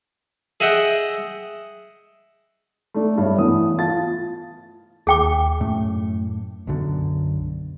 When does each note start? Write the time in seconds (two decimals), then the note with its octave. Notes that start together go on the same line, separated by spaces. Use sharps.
0.60 G#4 D#5 E5 F#5 G5
2.94 A3 D4
3.18 G2 G3 C#5 E5
3.38 E3 A3 B3 D#6
3.79 F4 A5 A6
5.07 D#2 G#4 G5 D6
5.60 F#2 A2 A3
6.67 B1 F#2 D3